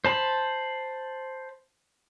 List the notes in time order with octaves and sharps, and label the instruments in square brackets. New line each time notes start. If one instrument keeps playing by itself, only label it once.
[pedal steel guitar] C5 A5 B5